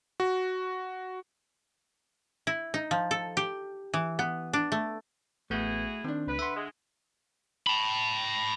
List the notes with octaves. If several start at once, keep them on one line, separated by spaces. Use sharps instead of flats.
F#4
E4
D#4
F3
A4
G4
E3
B3
D4
A3
A1 A3 B3 E4 F#4 G#4 G6
D#3 C4 D4
C#2 B4
D3 E5 F#5 C6
G#3
A5 B5